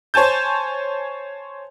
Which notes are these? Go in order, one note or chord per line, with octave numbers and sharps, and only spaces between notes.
C5 C#5 G#5 A5 G6